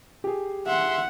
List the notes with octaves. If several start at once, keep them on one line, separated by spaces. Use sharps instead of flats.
G4 G#4
E5 F#5 C6